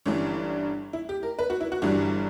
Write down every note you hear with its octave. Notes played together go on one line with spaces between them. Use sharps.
G1 G2 E3 G3 C#4
E4
G4
A#4
B4
F#4
E4
F#4
G1 G2 E3 G3 F#4